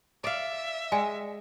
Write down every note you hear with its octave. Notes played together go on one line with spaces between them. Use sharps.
D5 E5 F5
G#3 D5 G5 G#5